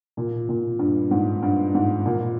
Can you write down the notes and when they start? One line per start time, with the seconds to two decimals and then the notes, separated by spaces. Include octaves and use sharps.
0.17 A#2
0.49 A#2
0.79 G2
1.11 G#2
1.42 G2
1.75 G#2
2.06 A#2